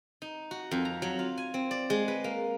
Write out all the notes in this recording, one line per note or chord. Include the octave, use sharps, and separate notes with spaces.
D#4
F#4
F2
A#5
F#3
F4
G#5
C4
D5
G#3
B4
A#3